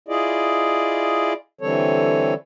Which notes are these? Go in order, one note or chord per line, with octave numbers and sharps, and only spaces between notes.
E4 F4 G#4 D5 D#5
D3 E3 G3 C4 A4 C#5